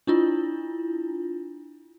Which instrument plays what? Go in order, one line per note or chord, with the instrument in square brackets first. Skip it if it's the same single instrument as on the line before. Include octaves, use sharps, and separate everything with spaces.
[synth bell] D4 E4 F4